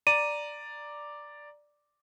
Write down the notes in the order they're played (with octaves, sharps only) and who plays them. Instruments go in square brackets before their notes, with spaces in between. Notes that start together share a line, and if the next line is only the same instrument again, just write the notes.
[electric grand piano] D5 A#5 [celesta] D#7